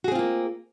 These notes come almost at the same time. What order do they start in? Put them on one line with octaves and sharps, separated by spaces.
F#4 G#4 C4 F4 A#3